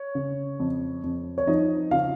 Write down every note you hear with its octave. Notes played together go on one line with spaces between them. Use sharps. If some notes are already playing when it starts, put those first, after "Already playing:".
Already playing: C#5
C#3
F2
F2
C#5
F3 D#4 D#5
C#3 F4 F5